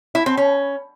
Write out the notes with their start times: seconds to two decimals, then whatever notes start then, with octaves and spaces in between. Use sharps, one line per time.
0.15 E4
0.26 C4
0.37 C#4